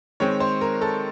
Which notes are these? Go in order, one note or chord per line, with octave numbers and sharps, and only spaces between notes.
D#3 G#3 C4 C#5
C5
A#4
A4